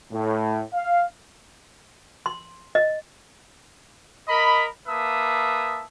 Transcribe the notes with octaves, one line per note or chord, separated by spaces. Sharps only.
A2
F5
C6
D#5
A#4 D#5 B5
A#3 B4 E5 A5 D#6